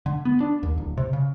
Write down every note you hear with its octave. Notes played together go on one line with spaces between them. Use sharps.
D3
B3
D4
D#2
D1
C3
C#3